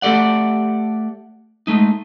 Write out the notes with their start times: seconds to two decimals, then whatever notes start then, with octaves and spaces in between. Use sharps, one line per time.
0.02 A3 G4 A4 D5 F#5
1.67 G#3 A3 D#4